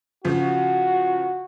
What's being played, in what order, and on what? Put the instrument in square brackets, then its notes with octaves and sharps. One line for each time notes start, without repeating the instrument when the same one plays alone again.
[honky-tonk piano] C#3 F3 [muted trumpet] F#4